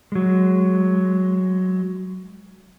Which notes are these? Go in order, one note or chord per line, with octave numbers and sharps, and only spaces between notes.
F#3 G#3